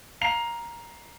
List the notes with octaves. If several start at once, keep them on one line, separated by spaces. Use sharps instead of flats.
F5 A#5 C7 F7